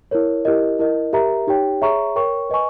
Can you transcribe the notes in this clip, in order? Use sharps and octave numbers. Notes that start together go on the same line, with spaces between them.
E4 A#4 C#5
E4 G4 A#4 D#5
E4 A#4 D#5
G4 A#4 E5 A#5
D#4 G4 C#5 G5
G#4 C#5 E5 A#5 C#6
A#4 C#5 G5 C#6
B4 D#5 G#5 C#6